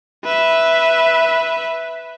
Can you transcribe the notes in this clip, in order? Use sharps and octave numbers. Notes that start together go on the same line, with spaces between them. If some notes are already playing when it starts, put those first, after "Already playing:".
B4 E5